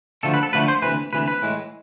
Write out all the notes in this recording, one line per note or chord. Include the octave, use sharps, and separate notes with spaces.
D2 D3 F3 A3 A4
B4
A4
D2 D3 F3 A3 B4
C5
D2 C3 E3 B4
D2 C3 E3 B4
B4
A2 E3 G#3